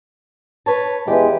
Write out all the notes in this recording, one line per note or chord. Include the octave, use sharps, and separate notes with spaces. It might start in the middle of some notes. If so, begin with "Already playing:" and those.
B4 C#5 A5
E2 G#3 G4 B4